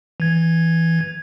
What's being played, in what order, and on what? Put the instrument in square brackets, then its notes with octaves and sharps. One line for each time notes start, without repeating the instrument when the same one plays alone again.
[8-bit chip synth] E3 G#6